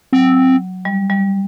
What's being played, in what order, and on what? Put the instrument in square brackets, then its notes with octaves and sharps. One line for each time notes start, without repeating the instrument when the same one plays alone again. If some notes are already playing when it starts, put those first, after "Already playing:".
[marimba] F#3 [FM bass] C4
[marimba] G3
G3